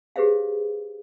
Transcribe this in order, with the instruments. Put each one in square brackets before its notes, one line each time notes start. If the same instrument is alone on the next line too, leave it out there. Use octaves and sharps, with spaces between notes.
[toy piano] G4 G#4 B4 C5 E5 F5